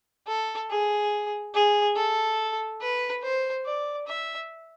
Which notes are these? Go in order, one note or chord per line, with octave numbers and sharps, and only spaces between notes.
A4
G#4
G#4
A4
B4
C5
D5
E5